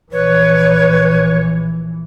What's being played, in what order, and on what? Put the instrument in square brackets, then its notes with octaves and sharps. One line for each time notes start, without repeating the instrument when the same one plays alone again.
[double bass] A#1 E3 [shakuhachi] B4 [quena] C#5